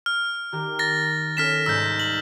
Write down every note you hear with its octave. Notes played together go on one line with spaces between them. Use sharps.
F6
D#3 G4 A#4
F6 A6 A#6
C#4 A4 F6 B6 E7
C2 G#2 E6 G6
F#7